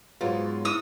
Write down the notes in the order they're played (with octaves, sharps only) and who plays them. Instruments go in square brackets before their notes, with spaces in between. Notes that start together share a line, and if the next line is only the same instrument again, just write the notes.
[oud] G#2 B3 [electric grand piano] F#3 F4
[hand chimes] E4 [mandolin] D#6 E6